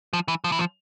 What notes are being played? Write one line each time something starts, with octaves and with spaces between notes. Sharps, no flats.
F3
E3
F3
E3
F3